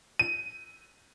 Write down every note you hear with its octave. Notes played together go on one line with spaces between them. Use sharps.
D#7